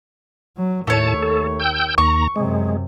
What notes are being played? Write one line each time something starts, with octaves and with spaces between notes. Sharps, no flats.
F#3
D#2 A2 A3 C#5 A5
A4
G5 E6 G6
D#2 A#5 C#6
F#2 C3 G#3